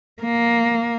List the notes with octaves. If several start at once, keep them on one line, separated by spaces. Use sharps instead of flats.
A#3